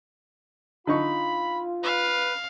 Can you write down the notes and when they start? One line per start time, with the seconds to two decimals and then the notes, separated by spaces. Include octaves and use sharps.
0.87 D3 D#4 F4 B5 C#6
1.84 B4 F5